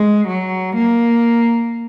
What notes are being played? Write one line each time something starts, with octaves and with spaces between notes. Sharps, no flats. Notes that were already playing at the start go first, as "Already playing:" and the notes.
Already playing: G#3
F#3
A#3